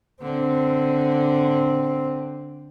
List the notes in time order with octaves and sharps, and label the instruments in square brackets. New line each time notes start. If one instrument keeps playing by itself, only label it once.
[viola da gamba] D3 [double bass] C4